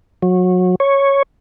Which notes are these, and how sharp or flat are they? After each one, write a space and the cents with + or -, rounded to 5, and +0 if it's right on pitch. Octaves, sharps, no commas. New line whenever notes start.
F#3 -25
C#5 -5